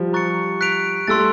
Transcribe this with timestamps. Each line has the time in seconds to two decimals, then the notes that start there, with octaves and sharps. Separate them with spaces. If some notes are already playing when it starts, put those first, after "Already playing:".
Already playing: F3 G3
0.13 A#5 C#6 F#6 A6 C#7
0.61 F#6 B6 D7 F7
1.08 G3 A3 C6 E6 A6